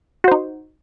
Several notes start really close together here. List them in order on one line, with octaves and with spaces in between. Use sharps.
F#4 C5 D#4